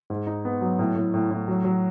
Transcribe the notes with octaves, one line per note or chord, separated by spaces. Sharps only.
G#2
D#4
B3
F#3
A2
A2
A2
A2
F#3
F#3